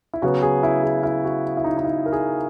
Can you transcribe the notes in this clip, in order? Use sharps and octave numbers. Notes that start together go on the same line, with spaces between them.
E4
C#3 F#3 B3 F#4
G#4
E4
G#4
E4
F#4
E4
D#4
D#4
E4
A#4
G#4